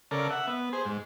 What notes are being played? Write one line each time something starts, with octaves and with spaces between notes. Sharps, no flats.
C#3 A4 A#4 D5
E5 F#5
B3
G#4 C5
G#2